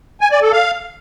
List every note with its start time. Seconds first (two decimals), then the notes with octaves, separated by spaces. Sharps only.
0.21 G#5
0.31 D5
0.42 A4
0.53 F5